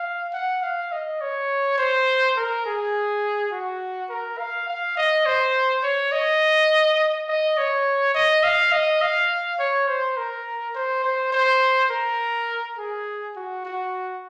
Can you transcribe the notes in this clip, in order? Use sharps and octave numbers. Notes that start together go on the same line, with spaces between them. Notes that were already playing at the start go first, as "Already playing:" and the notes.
Already playing: F5
F#5
F5
D#5
C#5
C5
A#4
G#4
F#4
A#4
F5
F5
D#5
C5
C#5
D#5
D#5
C#5
D#5
F5
D#5
F5
C#5
C5
A#4
C5
C5
C5
A#4
G#4
F#4
F#4